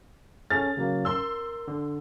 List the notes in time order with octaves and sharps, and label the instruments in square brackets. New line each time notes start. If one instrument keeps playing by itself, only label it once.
[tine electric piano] C#4 G#4 A4 [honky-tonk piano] F6 A6
[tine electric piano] C#3 F#3 A#3
[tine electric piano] A#4 [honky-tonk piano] C6 E6
[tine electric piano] D3